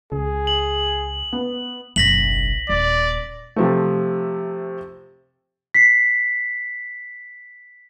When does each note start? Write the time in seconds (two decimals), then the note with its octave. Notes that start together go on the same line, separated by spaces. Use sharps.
0.12 C#2 G#4
0.47 F#7
1.33 B3
1.96 F#1 B1 A#6 B6 F#7
2.69 D#1 D5
3.56 C3 F3 A3
5.74 B6 C7